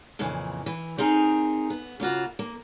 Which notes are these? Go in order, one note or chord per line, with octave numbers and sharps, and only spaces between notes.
F2 A#2 C#3 E3
E3
C4 D#4 G#4 A#4
B3
C#3 A#3 F4 F#4
A#3